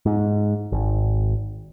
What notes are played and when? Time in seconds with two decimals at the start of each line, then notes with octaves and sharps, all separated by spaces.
0.06 G#2
0.72 G#1